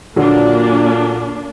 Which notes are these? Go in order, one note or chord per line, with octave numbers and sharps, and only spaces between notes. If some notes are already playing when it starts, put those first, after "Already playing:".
A#2 D3 F#3 A#3 D4